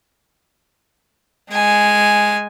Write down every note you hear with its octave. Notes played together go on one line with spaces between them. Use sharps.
G#3 G#5